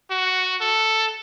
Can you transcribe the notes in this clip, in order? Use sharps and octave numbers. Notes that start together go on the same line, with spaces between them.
F#4
A4